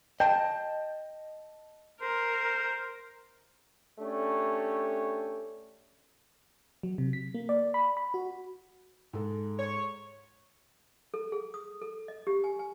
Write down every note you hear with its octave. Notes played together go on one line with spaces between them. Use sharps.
D#5 G5 A5
A#4 C5
A3 C#4 D4 G4
F#3
C3
B6
A#3
D5
B5
B5
F#4
G#2 G#3 A4
C#5
A4
G#4
D#6
A4
D#5
G4
G#5
G#5